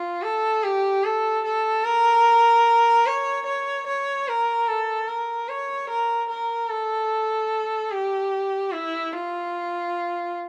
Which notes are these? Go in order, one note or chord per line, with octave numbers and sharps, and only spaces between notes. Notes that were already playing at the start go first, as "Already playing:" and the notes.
Already playing: F4
A4
G4
A4
A4
A#4
C#5
C#5
C#5
A#4
A4
A#4
C#5
A#4
A#4
A4
G4
E4
F4